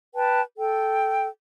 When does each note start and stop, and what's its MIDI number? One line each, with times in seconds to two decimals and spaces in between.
0.15 0.42 71
0.15 0.42 79
0.15 0.42 81
0.58 1.27 69
0.58 1.27 79